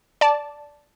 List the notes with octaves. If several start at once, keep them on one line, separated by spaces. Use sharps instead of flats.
D5 A5